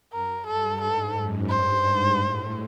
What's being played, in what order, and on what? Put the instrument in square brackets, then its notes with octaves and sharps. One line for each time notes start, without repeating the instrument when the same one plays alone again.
[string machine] F#2 [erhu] A#4
[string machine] G2 [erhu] A4
[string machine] G#2 [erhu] A4
[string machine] F#2
[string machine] G2 [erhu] C5
[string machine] G#2
A2